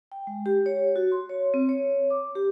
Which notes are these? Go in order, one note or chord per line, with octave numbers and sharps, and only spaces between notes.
G5
G#3
G4
C#5
F#4
C6
C#5
C4
C#5
D6
G4